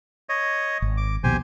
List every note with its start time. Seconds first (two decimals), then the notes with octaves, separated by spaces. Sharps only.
0.29 C#5 D#5
0.82 G#1
0.97 D6
1.24 A#1 D#2 B2 G4 C5 G#5